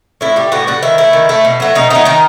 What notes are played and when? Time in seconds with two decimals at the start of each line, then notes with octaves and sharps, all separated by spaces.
0.21 A2 E4
0.36 G3 G4
0.52 A2 F#4
0.67 G3 F#4
0.83 D#3 E4
0.98 A3 E4
1.13 D#3
1.29 A3
1.45 B2
1.60 F#3 A3
1.75 B2 D#4
1.90 F#3 A3 D#4
2.05 D#3 D#4